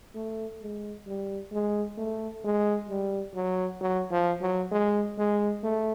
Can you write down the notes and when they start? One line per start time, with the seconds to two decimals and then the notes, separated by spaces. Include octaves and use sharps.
0.15 A3
0.62 G#3
1.07 G3
1.53 G#3
1.98 A3
2.44 G#3
2.89 G3
3.35 F#3
3.81 F#3
4.11 F3
4.42 F#3
4.72 G#3
5.18 G#3
5.63 A3